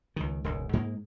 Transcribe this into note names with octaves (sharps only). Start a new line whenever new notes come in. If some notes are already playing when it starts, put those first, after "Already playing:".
C#2 D#3
E1 C#2 G#2
G#2 G#3 A#3